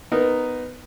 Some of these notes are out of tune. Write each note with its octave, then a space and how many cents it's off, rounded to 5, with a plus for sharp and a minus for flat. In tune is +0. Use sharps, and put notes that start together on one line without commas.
B3 +10 D#4 -5 A#4 +0